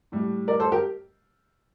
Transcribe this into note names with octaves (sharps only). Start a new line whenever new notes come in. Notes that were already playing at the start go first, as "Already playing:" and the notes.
A2 G3
A#4 D5
A4 C5
G4 A#4